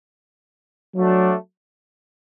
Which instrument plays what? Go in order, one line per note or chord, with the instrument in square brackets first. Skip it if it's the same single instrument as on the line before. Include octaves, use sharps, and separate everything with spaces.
[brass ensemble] F#3 A3 D4